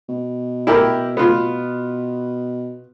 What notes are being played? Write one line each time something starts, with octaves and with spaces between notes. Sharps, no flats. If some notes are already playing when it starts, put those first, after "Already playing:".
B2
E4 G4 A#4
B3 F4